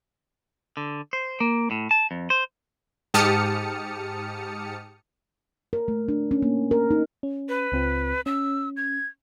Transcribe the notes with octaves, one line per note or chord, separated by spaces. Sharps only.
D3
C5
A#3
A2
A5
F2
C5
G#2 G4 A5 D#6 F6 C#7
A#4
A3
D4
C#4
A#3
A#4
D#4
C#4
B4
C#2 C4 F4
C#4 E6
G#6